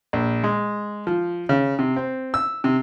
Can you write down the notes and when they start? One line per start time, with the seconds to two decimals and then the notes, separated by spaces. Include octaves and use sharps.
0.13 A#1
0.44 G#3
1.07 F3
1.49 C#3
1.79 C3
1.96 C4
2.34 E6
2.64 C3